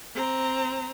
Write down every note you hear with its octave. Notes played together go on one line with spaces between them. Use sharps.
C4 A#5